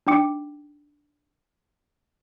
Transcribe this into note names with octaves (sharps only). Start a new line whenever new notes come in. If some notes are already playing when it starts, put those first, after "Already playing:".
D4 D#4 G5 D6 C#7